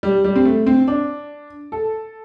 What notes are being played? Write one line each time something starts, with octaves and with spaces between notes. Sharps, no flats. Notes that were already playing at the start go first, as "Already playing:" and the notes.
G3
G3
C4
A3
C4
D4
A4